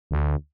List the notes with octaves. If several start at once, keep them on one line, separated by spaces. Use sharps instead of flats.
D2